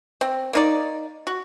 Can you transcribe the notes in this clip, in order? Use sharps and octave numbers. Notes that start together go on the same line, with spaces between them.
C4
A#3 D#4 D5
F#4